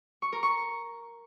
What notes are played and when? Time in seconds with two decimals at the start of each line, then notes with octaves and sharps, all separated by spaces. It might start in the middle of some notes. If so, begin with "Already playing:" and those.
0.22 C#6
0.32 A#4
0.43 C#6